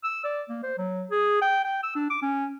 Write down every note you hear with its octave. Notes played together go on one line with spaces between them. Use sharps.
E6
D5
A#3
C5
F#3
G#4
G5
G5
E6
D4
D6
C#4